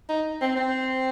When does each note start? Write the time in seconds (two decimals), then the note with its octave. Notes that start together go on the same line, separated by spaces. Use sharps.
0.09 D#4
0.41 C4
0.56 C4